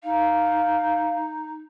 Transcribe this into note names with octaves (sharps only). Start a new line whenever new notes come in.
D#4 F5